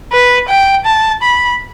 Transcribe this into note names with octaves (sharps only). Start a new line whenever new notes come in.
B4
G5
A5
B5